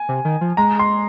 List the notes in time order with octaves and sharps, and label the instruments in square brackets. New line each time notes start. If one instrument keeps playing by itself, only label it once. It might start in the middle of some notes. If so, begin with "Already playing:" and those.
Already playing: [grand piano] G#5
[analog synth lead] C3
D#3
F3
[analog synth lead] G#3 [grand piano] A#5
[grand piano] C6